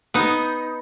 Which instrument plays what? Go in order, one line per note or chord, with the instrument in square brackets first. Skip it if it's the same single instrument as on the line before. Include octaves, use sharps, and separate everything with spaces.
[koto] B3 D#4